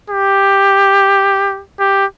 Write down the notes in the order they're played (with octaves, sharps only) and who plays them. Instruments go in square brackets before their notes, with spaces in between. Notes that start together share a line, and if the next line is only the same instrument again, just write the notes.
[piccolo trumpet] G4
G4